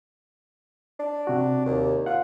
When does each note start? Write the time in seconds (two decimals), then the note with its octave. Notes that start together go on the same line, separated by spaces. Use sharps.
0.99 D4
1.27 C3 F#4
1.66 D#2
2.06 F4 F#5